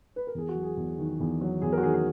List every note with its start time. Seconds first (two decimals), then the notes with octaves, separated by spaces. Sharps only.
0.16 B4
0.27 A#4
0.35 E2 G#4
0.49 F#4
0.55 F#3
0.63 G#4
0.77 E2
0.98 D#3
1.20 E2
1.41 F#3
1.62 E2 G#4
1.72 A#4
1.78 F#4
1.83 D#3 G#4
1.94 G#4